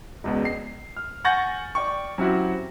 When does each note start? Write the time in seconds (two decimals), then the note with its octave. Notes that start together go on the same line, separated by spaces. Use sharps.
0.24 E1 C#2 B2
0.45 C7
0.97 F6
1.25 F#5 G#5 C#6 G6 A6 A#6
1.75 D5 G5 C#6
2.18 F#3 C4 C#4 E4 F#4 G4